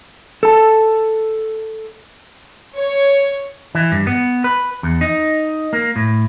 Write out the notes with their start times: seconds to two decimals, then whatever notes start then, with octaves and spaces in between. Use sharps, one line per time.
0.43 A4 A5
2.77 C#5
3.75 E3
3.92 G2
4.07 B3
4.44 B4
4.83 E2
5.01 D#4
5.73 A#3
5.96 A2